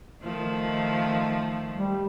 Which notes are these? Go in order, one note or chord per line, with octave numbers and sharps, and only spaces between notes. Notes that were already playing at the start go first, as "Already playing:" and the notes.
D#3 F3 A3
G3